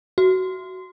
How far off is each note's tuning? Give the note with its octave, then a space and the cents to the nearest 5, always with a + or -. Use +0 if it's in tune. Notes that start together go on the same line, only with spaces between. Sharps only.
F#4 +15